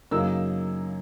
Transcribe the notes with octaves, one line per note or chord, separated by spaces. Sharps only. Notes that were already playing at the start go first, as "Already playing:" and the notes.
F#2 C#3 F#3 A#3 D#4 E6